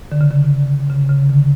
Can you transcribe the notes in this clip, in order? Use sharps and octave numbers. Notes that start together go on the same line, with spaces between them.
D3
C#3
D3
C#3
C#3
D3